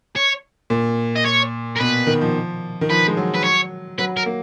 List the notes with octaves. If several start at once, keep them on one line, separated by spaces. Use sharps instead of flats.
C#5
A#2
D#5
C#5
A#4
B2 B4
D#3
F3
D#3
F3 B4
G#3
F#3
B4
C#5
F#3 B4
A#4
A#3